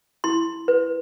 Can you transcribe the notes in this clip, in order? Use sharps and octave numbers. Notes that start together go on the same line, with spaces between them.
E4 C6
B4